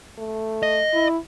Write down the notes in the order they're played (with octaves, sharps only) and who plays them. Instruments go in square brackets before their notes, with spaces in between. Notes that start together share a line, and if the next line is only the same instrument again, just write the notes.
[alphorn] A3
[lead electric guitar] D#5
[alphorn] E4